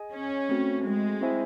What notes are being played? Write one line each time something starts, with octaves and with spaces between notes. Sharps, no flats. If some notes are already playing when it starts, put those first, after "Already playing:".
Already playing: G#4 D#5 G#5
C#4
A3 C4 F#4
G#3
C4 E4 C5 E5 G#5